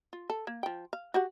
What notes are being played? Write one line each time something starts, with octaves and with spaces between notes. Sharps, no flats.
F4
A4
A#3
F3 G5
F5
F#4 G4 F#5